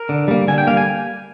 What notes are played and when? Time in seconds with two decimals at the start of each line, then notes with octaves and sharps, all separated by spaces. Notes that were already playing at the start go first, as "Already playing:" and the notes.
Already playing: A#4
0.09 D3
0.28 G3 A#3
0.48 D3 G#5
0.58 G5
0.67 G3 A#3 F5
0.77 G#5